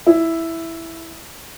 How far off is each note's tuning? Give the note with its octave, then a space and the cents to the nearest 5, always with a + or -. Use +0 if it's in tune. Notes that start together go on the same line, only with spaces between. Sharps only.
E4 +0